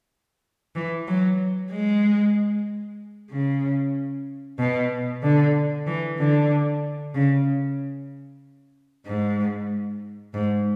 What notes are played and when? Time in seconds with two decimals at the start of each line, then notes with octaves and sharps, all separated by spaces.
0.76 E3
1.08 F#3
1.71 G#3
3.31 C#3
4.59 B2
5.23 D3
5.87 E3
6.19 D3
7.15 C#3
9.06 G#2
10.34 G#2